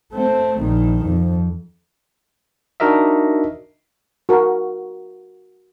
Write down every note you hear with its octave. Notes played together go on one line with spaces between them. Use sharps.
A3 C4
A#1 D#3
F2
D4 D#4 F#4 A#4 D#5 E5
F#4 A#4